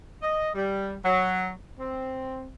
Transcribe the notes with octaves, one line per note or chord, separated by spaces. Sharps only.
D#5
G3
F#3
C4